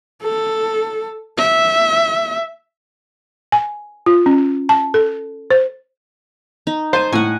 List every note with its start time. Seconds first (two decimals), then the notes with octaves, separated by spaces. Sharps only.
0.23 A4
1.38 E5
3.52 G#5
4.06 F4
4.26 C#4
4.69 A5
4.94 A4
5.51 C5
6.67 D#4
6.93 C5 G#5 A5
7.12 A2 F#5 G#5